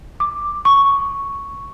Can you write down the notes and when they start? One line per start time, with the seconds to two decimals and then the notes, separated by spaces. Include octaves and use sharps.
0.20 D6
0.65 C#6